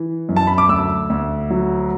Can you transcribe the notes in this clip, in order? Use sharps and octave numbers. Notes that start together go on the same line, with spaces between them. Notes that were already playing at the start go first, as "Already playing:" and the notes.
Already playing: E3
F#2
A5
B5
D6
D2 E6
D2
F#3